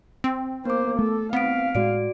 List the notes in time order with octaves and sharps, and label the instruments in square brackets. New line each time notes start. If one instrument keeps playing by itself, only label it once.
[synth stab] C4
[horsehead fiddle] A#3 C5 [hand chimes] B3 D6
[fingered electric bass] A3 [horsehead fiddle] A4
[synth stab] B3 [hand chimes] C4 B6 D7 [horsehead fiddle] F5
[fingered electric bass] A2 G#3 [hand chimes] F#4 D5 D7